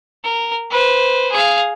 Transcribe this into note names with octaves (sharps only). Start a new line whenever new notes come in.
A#4
B4 C5
G#4 F5